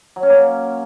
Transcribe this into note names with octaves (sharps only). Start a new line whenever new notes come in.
F#3
C#4
A#3